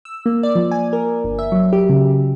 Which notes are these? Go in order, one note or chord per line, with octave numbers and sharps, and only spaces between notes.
E6
A#3
D5
F3
G#5
A#4
G1
E5
F#3
G4
C#3